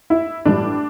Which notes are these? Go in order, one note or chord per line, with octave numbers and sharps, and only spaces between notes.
E4
A2 E3 G3 D4